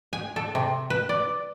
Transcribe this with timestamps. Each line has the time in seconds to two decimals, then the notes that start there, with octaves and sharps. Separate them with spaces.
0.13 G#5
0.36 A4
0.55 C3
0.90 B4
1.09 D5